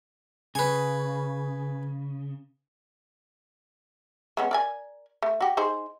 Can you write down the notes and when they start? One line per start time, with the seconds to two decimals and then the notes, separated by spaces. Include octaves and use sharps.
0.55 C#3 B4 G#5
4.37 G#3 B3 C#4
4.51 A#4 D5 G#5
5.23 A3
5.41 F#4 G4
5.57 D#4 G#4 C5